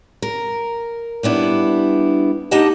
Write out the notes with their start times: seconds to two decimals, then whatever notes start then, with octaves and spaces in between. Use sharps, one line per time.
0.22 A#4
1.23 G3 B3 D4 E4
2.51 A#3 D#4 G4 D#5 F#5 A5